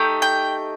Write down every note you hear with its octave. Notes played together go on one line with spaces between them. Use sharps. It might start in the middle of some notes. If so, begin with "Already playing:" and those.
Already playing: A3 D#4 G4
G5